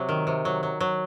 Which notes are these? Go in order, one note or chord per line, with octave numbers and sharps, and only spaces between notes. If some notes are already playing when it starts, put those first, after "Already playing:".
Already playing: C3 F#3
D#3
C3
F#3
F#3
F#3